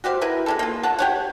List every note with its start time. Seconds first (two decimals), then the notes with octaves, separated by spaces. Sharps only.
0.04 F#4 G4 C5 F5
0.21 E4 A#4 B4
0.46 G#3 C#4 A4
0.59 A#3 F4
0.83 C#5 F#5 A5
0.99 G4 C#5 F#5